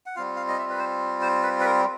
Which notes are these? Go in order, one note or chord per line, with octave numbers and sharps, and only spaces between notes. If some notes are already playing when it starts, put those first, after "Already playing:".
F#5
G3 C4 F4 F5
F5
D#5
E5
B4
C5
C5
B4
B4
A#4